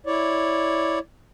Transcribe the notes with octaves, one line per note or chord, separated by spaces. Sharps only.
E4 C#5 D5